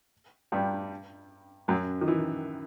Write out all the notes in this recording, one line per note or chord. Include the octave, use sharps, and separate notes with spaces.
G2 G3
F#2 F#3
D#3
E3